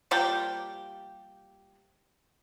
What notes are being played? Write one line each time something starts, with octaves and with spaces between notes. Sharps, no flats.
F3 G3 A#3 G4